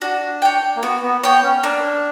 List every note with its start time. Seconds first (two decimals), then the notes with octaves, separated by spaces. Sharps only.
0.01 D4 F#4
0.42 C#5 G5
0.76 A#3
0.82 B3 F#4
1.03 B3
1.23 B3 C#5 G5
1.43 C#4
1.63 A#3 D4